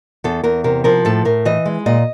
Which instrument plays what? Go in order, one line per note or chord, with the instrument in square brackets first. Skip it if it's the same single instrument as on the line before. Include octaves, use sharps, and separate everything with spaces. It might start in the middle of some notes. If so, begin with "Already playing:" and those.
[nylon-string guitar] E2 A4
E2 A#4
C3 A#4
F3 A#4
A2 A4
A2 A#4
E3 D#5
G#3
A#2 D#5